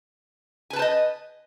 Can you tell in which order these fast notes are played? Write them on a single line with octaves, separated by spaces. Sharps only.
G#5 B4 A5 C5 D#5